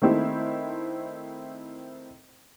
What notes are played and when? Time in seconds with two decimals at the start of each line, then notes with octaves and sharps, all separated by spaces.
0.02 D#3 A3 C4 E4